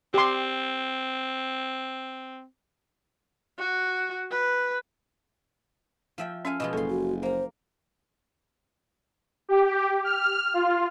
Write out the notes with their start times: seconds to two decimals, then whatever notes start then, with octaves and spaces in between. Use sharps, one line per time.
0.14 C4 G4 C6
3.58 F#4
4.31 B4
6.18 F3 E5 G5
6.45 C#4 A4 F5 G#5
6.60 B2 F3 G#3 D#5
6.73 F#1 A4 C#5 C6
6.90 F#4
7.23 A#3 C5 A#5
9.49 G4
10.04 F6
10.54 F4